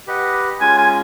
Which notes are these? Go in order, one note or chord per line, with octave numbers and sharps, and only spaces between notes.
G4 B4 D#5 F#5
G#3 C#4 F4 G#5
G#5